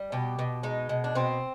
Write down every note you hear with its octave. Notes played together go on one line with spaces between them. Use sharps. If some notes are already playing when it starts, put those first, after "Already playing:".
Already playing: G3
B2 G4
B2
G#3 D#4
B2
D4
B2 C4